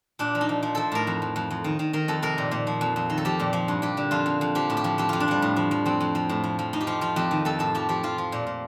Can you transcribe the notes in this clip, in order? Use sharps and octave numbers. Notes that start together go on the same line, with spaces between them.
A#2 D4
F3
D#4
F3
F3
F3 A4
A2 A#4
F2
F2
F2
F2
D#3
D#3
D#3 A#4
F2 A4
C3 A#4
A#2
A#2
F3
F2
F2
D#3
A4
F3 G4
A#2
F3
G2
G2 G4
D3
F2 F4
F2
F2
F3 G4
A2
G4
F3
F2 G4
F2 F4
D4
F2 G3
A2
F3
F3
F2 C4
F2
F3
A2
F3
F3
A2 D#4
G4
F3 F4
F3 F4
F2 G4
D#3
F2 A4
A2 A4
F3 G4
F3 G4
F3 F4
F3
A#2
A#2